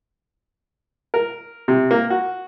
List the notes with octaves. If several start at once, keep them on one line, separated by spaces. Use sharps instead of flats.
A#4
C3
A#3
F#4